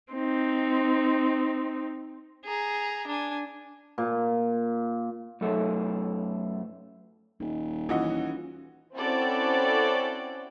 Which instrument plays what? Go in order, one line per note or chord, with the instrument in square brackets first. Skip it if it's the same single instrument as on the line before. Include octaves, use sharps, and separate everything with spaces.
[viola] C4 D#4
[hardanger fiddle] G#4 A#5
D4 G#5
[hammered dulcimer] A#2
[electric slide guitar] F#2 A3
[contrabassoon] D#1 [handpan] D#4
[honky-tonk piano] E3 F#4 D#5 [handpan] C#4 F4
[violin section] C4 C#4 E4 F#4 A4 D5